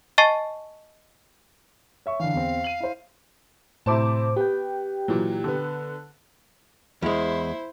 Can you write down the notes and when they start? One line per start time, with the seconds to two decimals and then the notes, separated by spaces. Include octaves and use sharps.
0.18 D#5 G#5 A5 C#6 A6 C7
2.06 C#5 E5 C#6
2.19 D3 E3 F5
2.34 E2 C4
2.64 D#7 F#7
2.80 E4 C5
3.86 A2 C3 E4 C5 A5 D6
4.36 B3 G4 G5
5.08 A#2 E3 F#3
5.44 D3 B3
7.02 E2 G#3 E4 C5